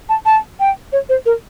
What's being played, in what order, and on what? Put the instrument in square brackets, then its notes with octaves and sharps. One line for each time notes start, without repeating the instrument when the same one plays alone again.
[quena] A5
A5
G5
C#5
C5
A#4